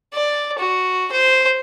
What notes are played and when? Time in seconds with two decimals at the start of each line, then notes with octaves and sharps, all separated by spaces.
0.14 D5
0.59 F#4
1.12 C5